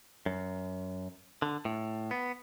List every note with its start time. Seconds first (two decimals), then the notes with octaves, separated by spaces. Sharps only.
0.26 F#2
1.42 D3
1.65 A2
2.11 B3